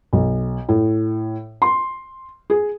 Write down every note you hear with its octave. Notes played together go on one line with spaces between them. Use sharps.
B1
A2
C6
G#4